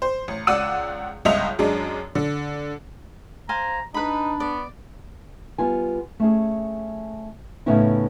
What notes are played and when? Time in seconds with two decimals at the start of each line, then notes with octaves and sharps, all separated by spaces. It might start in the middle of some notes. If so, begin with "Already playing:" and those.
0.02 C5
0.28 A1
0.47 C#2 D5 F#5 E6 D#7
1.25 G1 C#2 D#5 E5 F7
1.59 F#2 G#3 D4
2.15 D3
3.49 C5 F5 G#5 A#5
3.94 D4 D#4 B4 B5
4.40 B3 D5
5.58 G3 B3 F4 G#5
6.20 A3 C#4 G#4
7.66 A2 C#3 B3 C#4 D#4 E4